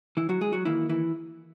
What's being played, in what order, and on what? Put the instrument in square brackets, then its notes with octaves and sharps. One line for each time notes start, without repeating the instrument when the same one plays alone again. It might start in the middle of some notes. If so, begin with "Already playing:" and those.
[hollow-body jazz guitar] E3 E4
F#3 F#4
G#3 G#4
F#3 F#4
D#3 E3 A#3 E4
E3 E4